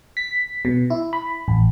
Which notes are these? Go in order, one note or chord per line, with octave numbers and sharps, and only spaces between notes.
B6
B2
E4
B5
A1